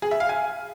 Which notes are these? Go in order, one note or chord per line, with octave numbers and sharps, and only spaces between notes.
G#4
E5
F5
G#5